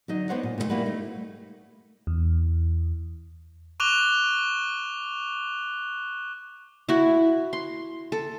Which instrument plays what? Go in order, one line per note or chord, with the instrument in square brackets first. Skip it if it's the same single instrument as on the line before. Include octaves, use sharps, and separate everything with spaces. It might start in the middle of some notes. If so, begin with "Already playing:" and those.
[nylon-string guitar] D3 F#3 D#4 D#5
B3 D4 D#4 C5 C#5 F#5
A#2
A#2 D3 A3
G3 A#3 E4 F#4 B4
A3 D#4
[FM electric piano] E2
[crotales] C#6 D6 F#6 F7 G7
[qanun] E4 F#4
C6
A4